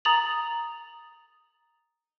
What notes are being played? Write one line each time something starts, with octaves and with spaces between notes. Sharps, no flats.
A#5 D#6 A6 F7 F#7